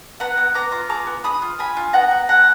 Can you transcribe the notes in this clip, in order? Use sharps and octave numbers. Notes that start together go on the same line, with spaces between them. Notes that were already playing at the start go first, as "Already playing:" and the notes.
B3 F#5 A#5
B3
B3 A#5 D6
F4
G#4 A#5 D6
B3
G#4 B5 D#6
F4
G#4 G#5 B5
F4
B3 F#5 A#5
B3
G#4 F#5 A#5